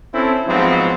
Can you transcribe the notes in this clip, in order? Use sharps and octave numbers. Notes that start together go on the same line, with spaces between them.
C4 C#4 E4 A4
G#2 F3 F#3 B3 C4